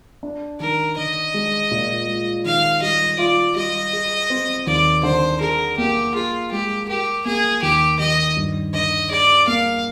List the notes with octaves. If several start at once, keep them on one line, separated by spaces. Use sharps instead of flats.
D4
D#3 A#4
D3 D#5
G#3
A#2
G#3
D#3 F5
G3 D#5
F4 D5
G3 D#5
G#4
C4
D#2 D5
D3 C5
G#4 A#4
A#3 G4
F4 G#4
G#3 G4
G4 A#4
A#3 G#4
D#2 G4
D#3 D#5
G2
D3 D#5
G#4 D5
A#3 F5